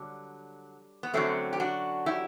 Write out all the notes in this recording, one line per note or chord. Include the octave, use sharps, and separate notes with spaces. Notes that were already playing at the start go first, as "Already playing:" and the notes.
Already playing: D3 F#3 G3
B3
F#2 D3 F#3 A3 C4
G4
D4 F#4
E4 G4